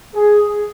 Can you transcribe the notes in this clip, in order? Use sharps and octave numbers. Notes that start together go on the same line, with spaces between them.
G#4